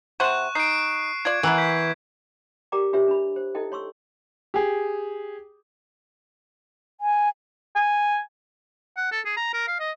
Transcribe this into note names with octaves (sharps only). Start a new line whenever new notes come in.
C3 C5 F#5 C#6 F#6 E7
D#4 C7 D7
F4 D5 G#6
E3 B3 A#4 F#5
G6 B6
G4 A#4 D5 G5 A#5 D6
D4 F4 G4 B4 C#5 E5
D4 B5
C5
D#4 E4 A4 D#5 G5
C#5 C6 C#6 E6
G4 G#4
G#5
G#5
F#5
A4
G#4
A#5
A#4
F5
D#5